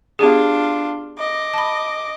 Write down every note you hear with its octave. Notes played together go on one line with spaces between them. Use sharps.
B3 D4 F4 G4 G#4
D#5 D6
A5 B5